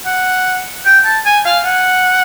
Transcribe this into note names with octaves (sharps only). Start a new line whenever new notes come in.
F#5
G5
A5
G#5
F5
F#5